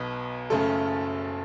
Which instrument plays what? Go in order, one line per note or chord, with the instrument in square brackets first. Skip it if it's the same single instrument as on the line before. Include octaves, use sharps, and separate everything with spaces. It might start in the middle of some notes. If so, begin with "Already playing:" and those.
Already playing: [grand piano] B1 B2 B3
F#1 F#2 C#3 A3 C#4 A4